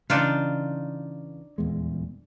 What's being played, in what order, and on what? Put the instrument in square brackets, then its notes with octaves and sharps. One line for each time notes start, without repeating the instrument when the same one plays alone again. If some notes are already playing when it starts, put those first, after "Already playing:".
[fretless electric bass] C#3 E3 [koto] D4 D#4 F4
[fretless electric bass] D#1 E2 G#3